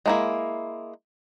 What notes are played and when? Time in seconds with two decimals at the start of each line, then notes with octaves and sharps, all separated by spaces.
0.06 G#3 A#3 E4